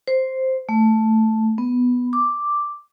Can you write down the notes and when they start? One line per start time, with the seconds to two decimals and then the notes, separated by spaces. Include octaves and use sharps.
0.08 C5
0.69 A3
1.58 B3
2.13 D6